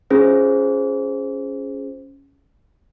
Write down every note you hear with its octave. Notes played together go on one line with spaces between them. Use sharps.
C#4 F4 G#4 C5